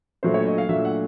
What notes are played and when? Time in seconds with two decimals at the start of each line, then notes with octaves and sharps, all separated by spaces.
0.23 A#2 F#3 A3 D4 C5
0.34 C#5
0.46 D#5
0.58 F5
0.69 A#2 F#3 A3 D4 E5
0.85 F#5